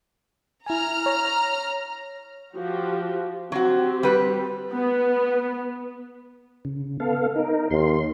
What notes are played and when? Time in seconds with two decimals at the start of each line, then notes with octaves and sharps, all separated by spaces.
0.66 E4 G#5 A#5 F6
1.06 C#5 A#6
2.54 F3 F#4 G4
3.52 F#3 C4 F#4 G4
4.03 G3 B4
4.72 B3
6.65 C#3
7.00 B3 A4 F5
7.36 D#4 A#4
7.70 D#2 C6